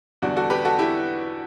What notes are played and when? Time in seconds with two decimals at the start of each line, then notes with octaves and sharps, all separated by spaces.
0.22 E2 D3 G3 D4 F#4
0.36 F#4 A4
0.50 G4 B4
0.65 F#4 A4
0.79 E4 G4